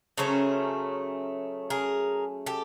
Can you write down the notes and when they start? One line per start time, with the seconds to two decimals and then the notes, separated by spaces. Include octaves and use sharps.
0.17 C#3 F#3 A3 C#4 A#4 C5
1.70 G#4 A#4
2.46 G4 A4